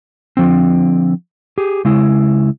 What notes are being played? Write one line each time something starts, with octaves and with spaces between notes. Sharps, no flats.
D3 F3 C4
G4 G#4
C#3 G#3 E4